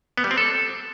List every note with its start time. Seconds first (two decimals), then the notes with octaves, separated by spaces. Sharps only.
0.17 B3
0.24 G3
0.31 C4
0.38 A4